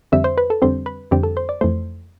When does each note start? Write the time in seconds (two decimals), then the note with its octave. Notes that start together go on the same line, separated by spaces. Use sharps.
0.12 F2 D3 G3 C4 E5
0.24 C5
0.38 B4
0.50 A4
0.62 F2 D3 G3 C4 C5
0.86 B4
1.11 F2 D3 G3 C4 G4
1.23 A4
1.37 C5
1.49 D5
1.61 F2 E3 A3 C5